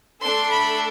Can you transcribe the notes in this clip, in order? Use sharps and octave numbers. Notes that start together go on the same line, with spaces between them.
A3 D4 A4 C6
B5